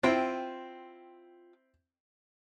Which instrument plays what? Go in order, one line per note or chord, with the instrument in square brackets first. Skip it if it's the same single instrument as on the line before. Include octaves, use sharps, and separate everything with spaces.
[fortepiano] C4 E4 [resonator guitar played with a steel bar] F4 G5